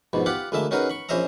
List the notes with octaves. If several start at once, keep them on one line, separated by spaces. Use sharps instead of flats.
A#1 G#2 B2
F4 G4 F#5 B5 D6
D2 G#3 A#3 E4 E5 A5
C#4 D#4 F#4 G#4 A#4 B4
B5 C#6
A#1 C#4 C5 D#5 E5 A#5